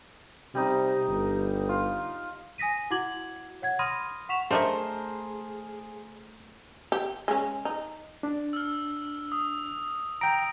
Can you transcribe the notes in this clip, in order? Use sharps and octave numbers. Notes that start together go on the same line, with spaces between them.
C3 G3 D#4 D#5
G1
F4
G#5 D#6 A#6 B6 D#7
E4 F#4 F#5 D6 G#6 F#7
C#5 F#5 G#6
B5 C6 D#6 F6 A#6 D#7
F#5 C#6 B6 E7 F7
A3 D4 G#4 A#4 C5 D#5 E5
G4
G#3 C#4
D#4
D4
E6 F6
D#6
G5 A#5 A#6 D7